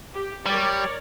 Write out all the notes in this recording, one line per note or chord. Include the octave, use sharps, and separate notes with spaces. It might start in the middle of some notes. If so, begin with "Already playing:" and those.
G4
G3 A#4 C#5 D5